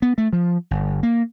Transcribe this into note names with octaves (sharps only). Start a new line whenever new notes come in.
B3
A3
F3
G1
A#3